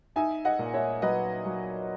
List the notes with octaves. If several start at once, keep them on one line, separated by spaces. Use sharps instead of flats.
D#4 E5 G#5
D#5 F#5
A#2
C#5 E5
F#3 B4 D#5
F#3